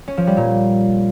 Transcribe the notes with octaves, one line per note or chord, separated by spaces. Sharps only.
C#4
F3
G3
A#2